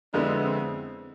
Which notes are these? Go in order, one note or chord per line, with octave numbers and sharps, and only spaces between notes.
F2 D3 G#3 B3 D4 E4
C4